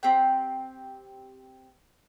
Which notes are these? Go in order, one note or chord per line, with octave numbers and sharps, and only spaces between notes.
C4 G4 G5